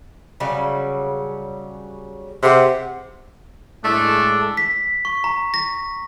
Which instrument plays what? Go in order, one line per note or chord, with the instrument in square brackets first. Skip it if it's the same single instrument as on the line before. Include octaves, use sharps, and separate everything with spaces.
[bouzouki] C#3 F#3 G3
[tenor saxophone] C3 [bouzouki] G4 G#4 F#5
[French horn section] A2 G#3 [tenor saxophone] A3 [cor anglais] D4 [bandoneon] A4
[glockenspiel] B6
C#6
A#5
A#6